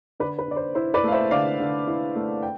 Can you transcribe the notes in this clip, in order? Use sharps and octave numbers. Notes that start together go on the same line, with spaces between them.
D3 B4 D5
B4
D3 D5
C5
E4 C5
B4 D5
A3 F5
C5 E5
D3 D5 F5
D3
E4
A3
G5